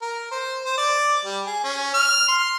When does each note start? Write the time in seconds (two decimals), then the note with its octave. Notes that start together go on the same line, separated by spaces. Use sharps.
0.02 A#4
0.31 C5
0.65 C5
0.78 D5
1.25 G3
1.46 G#4
1.64 C#4
1.94 F6
2.29 C6